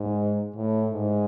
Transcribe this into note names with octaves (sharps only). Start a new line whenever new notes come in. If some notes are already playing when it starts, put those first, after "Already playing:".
Already playing: G#2
A2
G#2